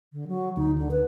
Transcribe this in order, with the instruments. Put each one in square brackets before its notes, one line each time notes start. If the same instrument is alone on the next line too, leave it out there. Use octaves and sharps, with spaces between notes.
[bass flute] D3
F#3
[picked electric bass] D2 [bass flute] D#4
[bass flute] D3
B4